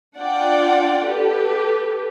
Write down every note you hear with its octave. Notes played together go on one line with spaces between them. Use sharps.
D4 F4 D5 F#5 G5
G4 A4 B4